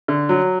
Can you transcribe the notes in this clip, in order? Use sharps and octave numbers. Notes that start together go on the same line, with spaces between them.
D3
F#3